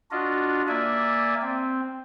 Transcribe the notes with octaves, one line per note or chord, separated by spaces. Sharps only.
D4 F4 F#4 D#5
A#3 D5 E5 G#5
C4